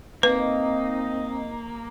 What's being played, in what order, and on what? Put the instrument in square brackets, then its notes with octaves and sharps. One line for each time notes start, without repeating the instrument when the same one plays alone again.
[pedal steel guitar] A#3 [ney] C4 [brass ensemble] D#4 D#5 [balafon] B4